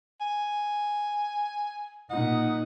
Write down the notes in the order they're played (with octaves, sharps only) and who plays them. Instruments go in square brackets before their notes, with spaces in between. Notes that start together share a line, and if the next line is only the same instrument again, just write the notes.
[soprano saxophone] G#5
[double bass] A#2 D#4 [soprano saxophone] F#5